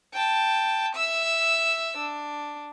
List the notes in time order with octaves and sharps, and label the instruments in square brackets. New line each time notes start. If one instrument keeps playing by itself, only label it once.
[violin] G5 A5
E5 E6
D4